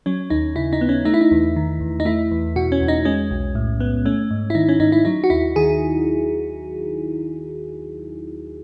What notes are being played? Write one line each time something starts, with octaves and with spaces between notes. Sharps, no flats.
F#3 C#4
D#2 D#4
C#3 E4
D#4
B3
C#4
A3 D#4
E4
D#4
E2
D#3
E2
D#4
A3 E4
E2
B2 F#4
C#4
E2
D#4
G#3 C#4
B1
A2
B3
A3 C#4
G#2
E4
D#3 D#4
C#4
G#2 D#4
E4
F#3 D#4
F#4
D#2 E4
D#3 G#4